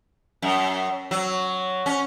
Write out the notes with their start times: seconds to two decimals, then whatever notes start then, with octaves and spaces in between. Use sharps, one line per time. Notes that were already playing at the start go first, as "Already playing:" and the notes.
0.42 F#2
1.11 F#3
1.86 C#4